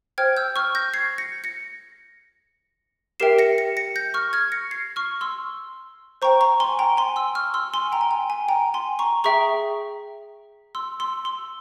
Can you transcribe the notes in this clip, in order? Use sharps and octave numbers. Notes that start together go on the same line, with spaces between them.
C5 G5 F6 G#6
E6 G6
C#6 F6
G6 A#6
G#6 C7
A#6 C#7
A#6 C#7
G4 A#4 E5 G5 C7 E7
A#6 C#7
A#6 C#7
A#6 C#7
G6 A#6
C#6 F6
F6 G#6
A#6 C#7
G#6 C7
C#6 F6
C6 E6
C5 G5 A#5 C#6
A#5 C#6
G#5 C6
G5 A#5
G#5 C6
C6 E6
C#6 F6
C6 E6
G#5 C6
G5 A#5
G#5
G5
G#5
G5 A#5
G#5 C6
A#5 C#6
G#4 E5 G5 A#5 C#6
C6 E6
C6 E6
C6 E6